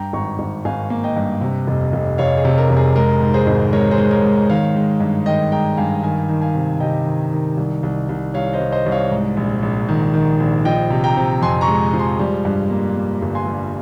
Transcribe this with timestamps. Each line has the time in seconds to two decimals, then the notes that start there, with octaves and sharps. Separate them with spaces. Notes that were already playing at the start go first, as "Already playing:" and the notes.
Already playing: G2 G5 A#5
0.13 G#1 A#5 C#6
0.39 G#1
0.65 G#1 F5 G#5
0.90 A#3
1.03 D#5 G5
1.17 G2
1.41 C3
1.67 F1
1.93 F1
2.18 F1 C#5 F5
2.37 G#4
2.45 C3
2.58 A#4
2.70 F1
2.77 G#4
2.96 G#3 A#4
3.21 G#2
3.34 G#4 C5
3.47 G#1
3.73 G#3 A#4 C#5
3.91 G#4 C5
3.98 G#3
4.11 A#4 C#5
4.23 G#2
4.49 D#3 C#5 F5
4.76 G#3
5.00 G2
5.26 D#3 D#5 G5
5.52 G#3 G5 A#5
5.77 G2 F5 G#5
6.03 D#3 F5 G#5
6.29 D#3
6.42 F5 G#5
6.55 C3
6.80 C3 D#5 G5
7.06 D#3
7.32 D#3
7.57 C2
7.83 C2
8.09 C2
8.34 C2 C#5 F5
8.53 C5 D#5
8.60 C2
8.72 C5 D#5
8.86 C2
8.92 C#5 F5
9.11 G#2
9.37 A#1
9.63 A#1
9.89 D#3
10.14 D#3
10.40 A#1
10.65 F3 D#5 G5
10.90 C3
11.04 G5 A#5
11.17 C3
11.42 F2 G#5 C6
11.61 A#5 C#6
11.68 G#3
11.94 F3
11.99 G#5 C6
12.19 G3
12.45 G2
12.70 A#3
12.97 A#3
13.22 G1
13.35 G#5 C6
13.47 G3